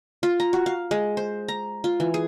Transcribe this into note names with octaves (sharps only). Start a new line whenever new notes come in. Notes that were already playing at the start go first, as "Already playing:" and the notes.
F4
A#5
F#4
F5
G#3
C5
A#5
F4
E3
G#4